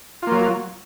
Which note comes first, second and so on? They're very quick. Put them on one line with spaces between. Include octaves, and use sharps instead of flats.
F4 A#3 F#3